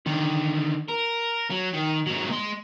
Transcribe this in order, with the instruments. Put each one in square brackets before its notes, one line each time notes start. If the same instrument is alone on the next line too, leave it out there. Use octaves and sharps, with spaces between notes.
[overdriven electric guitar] D3 D#3
A#4
F#3
D#3
G#2 F#3
G#3 C6